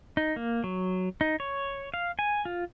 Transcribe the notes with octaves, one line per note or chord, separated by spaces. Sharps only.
D#4
A#3
F#3
D#4
C#5
F5
G#5
F4